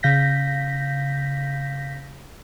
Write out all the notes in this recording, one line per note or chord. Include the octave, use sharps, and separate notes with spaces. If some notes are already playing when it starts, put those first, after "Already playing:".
C#3 F5 G6 A#6 B6